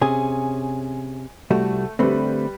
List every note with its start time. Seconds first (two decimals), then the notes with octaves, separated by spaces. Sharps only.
0.01 C3 C#4 G#4 G#5
1.50 C2 G3 A3 F#4
1.99 D3 G3 A3 C4 B4